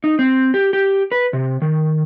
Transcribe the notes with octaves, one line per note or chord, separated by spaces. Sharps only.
D#4
C4
G4
G4
B4
C3
D#3